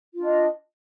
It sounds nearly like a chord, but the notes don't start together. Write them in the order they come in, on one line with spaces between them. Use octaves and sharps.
F4 D4 D#5